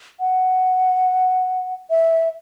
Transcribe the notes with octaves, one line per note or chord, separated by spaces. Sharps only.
F#5
E5